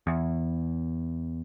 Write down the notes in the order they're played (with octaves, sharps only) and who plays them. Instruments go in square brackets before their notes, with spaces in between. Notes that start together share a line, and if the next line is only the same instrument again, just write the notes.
[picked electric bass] E2